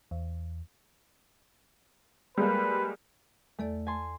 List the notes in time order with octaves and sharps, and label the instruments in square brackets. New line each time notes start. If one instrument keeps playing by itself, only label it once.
[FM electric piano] E2
[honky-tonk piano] G3 G#3 A#3 [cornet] B4
[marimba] E2 A4 D5 [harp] A3
[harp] G#5 A5 C6